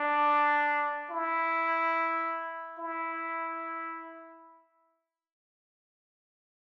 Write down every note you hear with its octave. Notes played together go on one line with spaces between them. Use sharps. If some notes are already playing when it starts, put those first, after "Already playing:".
Already playing: D4
E4
E4